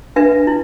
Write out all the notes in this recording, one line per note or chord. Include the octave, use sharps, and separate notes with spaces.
D4 B4 E5
E4